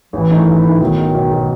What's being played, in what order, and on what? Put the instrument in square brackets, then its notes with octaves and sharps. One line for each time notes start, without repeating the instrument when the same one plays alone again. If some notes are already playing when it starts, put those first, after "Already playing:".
[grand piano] A1 [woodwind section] E3
[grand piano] G#2 D#3 A3 E4
A1
G#2 D#3 A3 E4
[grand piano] B1 [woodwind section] D#3
[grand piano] B2 G#3
B1
B2 G#3